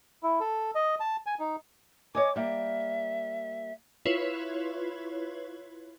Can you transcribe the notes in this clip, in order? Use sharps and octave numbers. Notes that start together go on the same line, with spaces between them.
E4
A4
D#5
A5
G#5
D#4
C#5 D#5 G#5 D6
G3 A#3 E5
E4 F4 B4 C#5